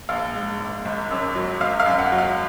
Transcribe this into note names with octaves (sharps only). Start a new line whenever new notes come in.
A#1 F5
G#2
A#1
G#1
F#2
F#3
G#1 F5
F5
F#2
F#5
F#3
F5